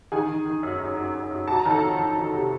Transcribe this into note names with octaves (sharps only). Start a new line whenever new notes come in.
D#3 G#4 G#5
D#3
D#3
F#2
F#2
F#2
F#2
F#2
F#3 A5
A#5
D#3
A4 A5
F2
D#3
D#3
C3